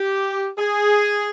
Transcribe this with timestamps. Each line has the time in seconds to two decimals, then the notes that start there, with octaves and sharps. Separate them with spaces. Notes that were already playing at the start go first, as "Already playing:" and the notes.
Already playing: G4
0.58 G#4